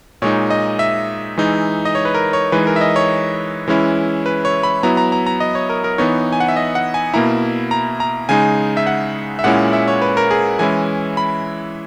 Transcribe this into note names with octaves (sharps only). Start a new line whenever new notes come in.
A#2 G#3 D#4 C#5
D#5
E5
E3 G#3 D#4
D#5
C#5
B4
A#4
C#5
E3 G#3 D#4 B4
A#4
E5
D#5
C#5
E3 G#3 C#4 E4
B4
C#5
B5
F#3 B3 E4 A#5
A#5
A#5
A#5
D#5
C#5
A#4
A#4
E3 B3 D#4 C#5
G#5
F#5
E5
D#5
F#5
G#5
B2 A#3 E4 A#5
A#5
A#5
C#3 G#3 D#4 G#5
E5
F#5
E5
A#2 G#3 C#4 E4 F#5
E5
C#5
B4
A#4
G#4
E3 G#3 C#4 E4 G#5
B5